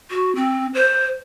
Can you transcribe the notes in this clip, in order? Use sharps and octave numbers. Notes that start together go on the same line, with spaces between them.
F#4
C4
C5